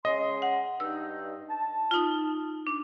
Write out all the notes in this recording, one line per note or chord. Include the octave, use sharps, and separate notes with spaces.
C#3 G#3 D#5 C6
F#5
G2 D#4 E6
A5
D#4 F4
D4